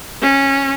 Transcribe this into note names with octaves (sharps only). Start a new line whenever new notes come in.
C#4